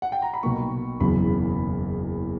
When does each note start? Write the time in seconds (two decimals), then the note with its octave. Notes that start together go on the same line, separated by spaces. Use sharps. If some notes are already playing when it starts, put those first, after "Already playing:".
0.02 F#5
0.12 G5
0.22 A#5
0.34 B5
0.43 B1 B2 A#3 C#6
1.00 F#1 E2 C#3 F#3 B5